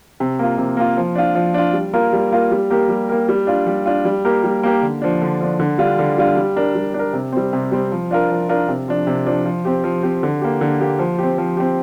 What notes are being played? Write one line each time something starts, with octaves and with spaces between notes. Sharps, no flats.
C3
A#3 F4
C3
A#3 F4
F3
D4 F4
F3
D4 F4
G3
A#3 F4 A#4
G3
A#3 F4 A#4
G3
A#3 G4 A#4
G3
A#3 G4 A#4
G3
D4 F4
G3
D4 F4
G3
A#3 G4 A#4
G3
A#3 G4 A#4
D3
F3 D4
D3
F3 D4
D3
G3 D4 F4
D3
G3 D4 F4
G3
D4 A#4
G3
D4
A#4
C3
G3 C4
C3
G3 C4
F3
D4 F4 A#4
F3
D4 F4 A#4
C3
F3 D4
C3
F3 D4
F3
C4 G4
F3
C4 G4
D3
A#3 G4
D3
A#3 G4
F3
C4 G4
F3
C4 G4